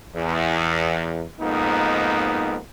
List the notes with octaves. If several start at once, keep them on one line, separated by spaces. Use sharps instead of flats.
E2
F2 G#2 A#3 B3 D#4